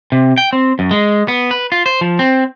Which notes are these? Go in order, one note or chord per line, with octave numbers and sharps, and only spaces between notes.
C3
G5
C4
F#2
G#3
B3
B4
F4
C5
F3
C4